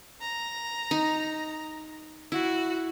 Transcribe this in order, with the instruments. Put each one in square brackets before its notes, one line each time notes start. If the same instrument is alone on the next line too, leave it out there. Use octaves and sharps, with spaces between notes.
[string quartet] A#5
[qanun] D#4
[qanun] E4 [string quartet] F#4